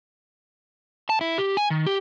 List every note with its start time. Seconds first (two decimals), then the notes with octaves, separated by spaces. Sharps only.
1.10 A5
1.21 E4
1.38 G4
1.57 G#5
1.70 D#3
1.86 G4